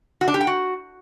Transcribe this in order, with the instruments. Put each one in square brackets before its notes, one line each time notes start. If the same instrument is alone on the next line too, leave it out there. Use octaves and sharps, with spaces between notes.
[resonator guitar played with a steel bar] F#4
D4
G4
G5
F#4